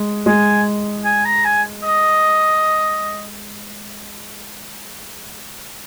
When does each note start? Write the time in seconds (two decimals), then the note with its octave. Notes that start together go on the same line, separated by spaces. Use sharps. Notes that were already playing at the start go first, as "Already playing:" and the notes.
Already playing: G#3
0.26 G#3 G#5
1.05 G#5
1.25 A#5
1.44 G#5
1.83 D#5